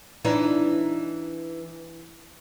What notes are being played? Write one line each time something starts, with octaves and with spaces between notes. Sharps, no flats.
E3 D4 D#4